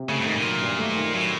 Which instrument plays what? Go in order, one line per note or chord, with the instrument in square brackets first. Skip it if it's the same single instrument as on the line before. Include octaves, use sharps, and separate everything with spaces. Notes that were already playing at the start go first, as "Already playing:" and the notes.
Already playing: [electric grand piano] C3
[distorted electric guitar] C#3 [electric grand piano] A3
[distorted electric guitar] G2
[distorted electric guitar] G#2 [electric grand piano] D#3
[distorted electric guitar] A#2
[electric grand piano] F#3
G2
A3
D#3
[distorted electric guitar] A2 [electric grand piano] F#3